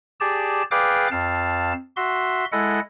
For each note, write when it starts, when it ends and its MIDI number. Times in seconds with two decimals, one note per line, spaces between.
0.20 0.63 67
0.20 0.63 68
0.20 0.63 74
0.20 0.63 81
0.71 1.08 68
0.71 1.08 71
0.71 1.08 74
0.71 1.08 77
0.71 1.08 79
0.71 1.08 86
1.12 1.73 41
1.12 1.73 77
1.12 1.73 81
1.97 2.45 66
1.97 2.45 76
1.97 2.45 84
2.52 2.80 56
2.52 2.80 64
2.52 2.80 69
2.52 2.80 75
2.52 2.80 78